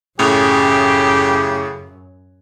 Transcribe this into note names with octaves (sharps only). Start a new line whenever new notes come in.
F#2 A2 C#3 G4